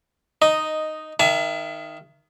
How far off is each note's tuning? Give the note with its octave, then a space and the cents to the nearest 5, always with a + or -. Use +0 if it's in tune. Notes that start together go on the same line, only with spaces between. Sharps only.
D#4 -5 D#5 +0
D#3 +0 E5 +35 A5 -45